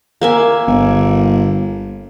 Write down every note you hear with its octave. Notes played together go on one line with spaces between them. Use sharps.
A#3 E5 G#5
G1